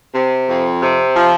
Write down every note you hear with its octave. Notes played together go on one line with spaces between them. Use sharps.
C3
F2
C3
F3